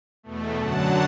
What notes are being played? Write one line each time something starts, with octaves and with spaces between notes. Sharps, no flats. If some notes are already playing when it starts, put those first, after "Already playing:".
E2 B2 A3
F#2 D3 F#3 F#5 A5